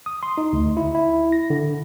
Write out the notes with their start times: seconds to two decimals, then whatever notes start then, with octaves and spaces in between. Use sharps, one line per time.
0.06 D#6
0.23 C6
0.38 D#4
0.53 D2
0.77 E4
0.95 E4
1.32 A#6
1.50 D3